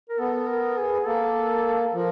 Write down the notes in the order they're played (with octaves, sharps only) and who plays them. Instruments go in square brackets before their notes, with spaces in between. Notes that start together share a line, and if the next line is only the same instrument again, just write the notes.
[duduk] A#4
[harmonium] B3 [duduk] A4
[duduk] A#4
G#4
[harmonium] A#3 [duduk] A4
[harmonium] F3 [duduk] A#4